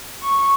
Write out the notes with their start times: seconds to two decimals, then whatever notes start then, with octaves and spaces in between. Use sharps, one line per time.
0.22 C#6